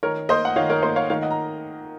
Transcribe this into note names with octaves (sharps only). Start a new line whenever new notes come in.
D#3 A#4 C#5
A#3 C5 D#5
F#5
D#3 C#5 F5
A#4 C#5
A#3 C5 D#5
C#5 F5
D#3 C#5 F5
D#5 F#5
A#5